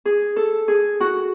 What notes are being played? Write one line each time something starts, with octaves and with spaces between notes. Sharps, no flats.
G#4
A4
G#4
F#4